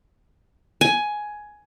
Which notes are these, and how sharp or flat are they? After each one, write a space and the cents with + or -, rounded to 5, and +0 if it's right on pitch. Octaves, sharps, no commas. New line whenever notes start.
G#5 +10